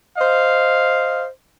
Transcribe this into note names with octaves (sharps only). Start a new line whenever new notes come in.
C5 D#5 F5